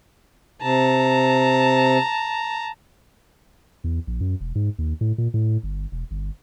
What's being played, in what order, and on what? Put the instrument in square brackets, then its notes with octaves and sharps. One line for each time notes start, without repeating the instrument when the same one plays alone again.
[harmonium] C3 [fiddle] A5 A#5
[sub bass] E2
A#1
F#2
E1
G#2
D#2
A2
A#2
A2
G1
E1
G1